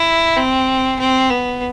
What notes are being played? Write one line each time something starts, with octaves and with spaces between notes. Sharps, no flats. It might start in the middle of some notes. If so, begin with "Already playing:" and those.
Already playing: E4
C4
C4
B3